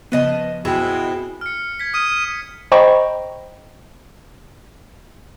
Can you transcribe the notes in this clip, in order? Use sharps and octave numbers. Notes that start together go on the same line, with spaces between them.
C#3 F3 B3 B4 D#5 A5
F#2 B2 G#3 C4 E4 G5
F6 C#7
G#6 B6
D#6 F6
C5 D#5 G5 A#5 B5 C#6